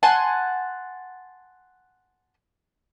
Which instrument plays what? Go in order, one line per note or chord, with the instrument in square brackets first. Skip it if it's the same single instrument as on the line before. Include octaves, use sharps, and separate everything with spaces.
[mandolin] F#5 G#5 A5 C6